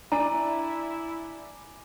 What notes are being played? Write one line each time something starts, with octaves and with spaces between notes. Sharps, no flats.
D4 E4 G#5 A#5 D6 D#7